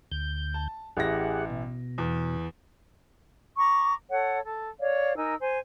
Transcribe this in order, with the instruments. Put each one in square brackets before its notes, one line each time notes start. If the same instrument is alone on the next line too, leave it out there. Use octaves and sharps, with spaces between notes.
[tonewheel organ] D2 G6
[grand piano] A5
[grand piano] A1 E4 A#6 [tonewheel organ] G4 G#4 F#5
[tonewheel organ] B2
[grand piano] E2
[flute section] A#5 C#6 D6
A4 C#5 F#5
A4
C#5 D5 F5
D#4 A#4 G#5 E6
C5 G#5